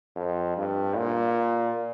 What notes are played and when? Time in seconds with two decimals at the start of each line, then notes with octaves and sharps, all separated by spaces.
0.16 F2
0.57 G2
0.97 A#2